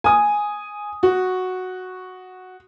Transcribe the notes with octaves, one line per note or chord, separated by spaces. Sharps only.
G#5 D#6
F#4